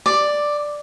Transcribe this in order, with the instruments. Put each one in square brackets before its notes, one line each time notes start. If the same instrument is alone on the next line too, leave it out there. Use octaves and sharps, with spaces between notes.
[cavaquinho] D5